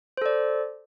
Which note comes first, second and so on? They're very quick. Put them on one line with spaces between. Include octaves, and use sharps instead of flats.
C5 A4 D5